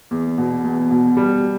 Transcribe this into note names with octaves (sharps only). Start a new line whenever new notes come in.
E2
B2
E2
B2
G3